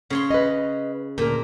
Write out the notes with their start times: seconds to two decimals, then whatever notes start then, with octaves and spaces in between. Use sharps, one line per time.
0.10 C#3 C#5 C6
0.30 B4 D#5
1.18 D2 A#2 A#4